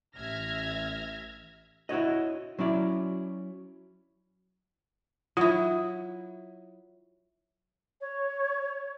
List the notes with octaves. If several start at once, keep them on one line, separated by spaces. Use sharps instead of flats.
A1 E5 F6 G#6 A#6
E4 F#4 C#5 D#5
F#3 C#4 E4 D5
F#3 E4 F4
C#5